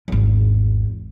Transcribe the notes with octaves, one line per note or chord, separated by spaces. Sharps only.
G#1 E2